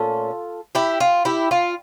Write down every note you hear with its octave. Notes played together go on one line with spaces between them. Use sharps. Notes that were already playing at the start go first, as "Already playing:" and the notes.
Already playing: A#2 A3 C#4 F4 A4
E4 G4
F4
E4 G4
F4